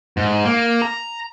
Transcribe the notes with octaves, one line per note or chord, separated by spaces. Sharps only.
G#2
A#3
A#5